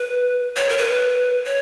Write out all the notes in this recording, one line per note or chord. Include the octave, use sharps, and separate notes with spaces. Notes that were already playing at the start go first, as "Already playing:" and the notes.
Already playing: B4
C#5
A#4
B4
C#5